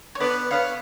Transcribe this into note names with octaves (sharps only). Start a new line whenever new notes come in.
C#5
D3 B3 B4 D5
D3 B3 C#5 F5